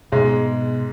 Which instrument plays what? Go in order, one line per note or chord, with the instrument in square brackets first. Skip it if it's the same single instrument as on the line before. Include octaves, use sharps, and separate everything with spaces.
[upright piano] G#2 G#3 [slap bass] B2